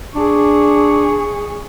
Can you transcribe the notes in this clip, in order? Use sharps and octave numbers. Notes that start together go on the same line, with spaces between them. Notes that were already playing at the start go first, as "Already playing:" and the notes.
D4 G#4 C#6